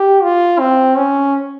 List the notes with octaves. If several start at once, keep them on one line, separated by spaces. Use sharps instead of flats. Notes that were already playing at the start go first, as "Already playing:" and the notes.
Already playing: G4
F4
C4
C#4